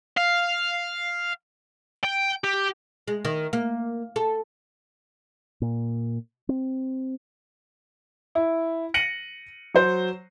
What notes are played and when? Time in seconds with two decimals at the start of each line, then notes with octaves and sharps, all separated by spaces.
0.17 F5
2.03 G5
2.44 G4
3.08 G#3
3.25 D#3
3.53 A#3
4.16 A4
5.62 A#2
6.49 C4
8.35 E4
8.94 A#6 C#7 D#7 F#7
9.74 F#3 C5